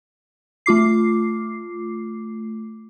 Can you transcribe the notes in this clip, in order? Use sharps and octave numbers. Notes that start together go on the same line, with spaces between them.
A3 F4 D6 C7